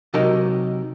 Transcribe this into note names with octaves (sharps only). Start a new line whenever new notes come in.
C3 F#3 D#4 G4 A#4